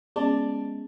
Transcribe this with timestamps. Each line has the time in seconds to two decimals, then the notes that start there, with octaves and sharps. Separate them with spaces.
0.16 G#3 B3 C#4 D5 A5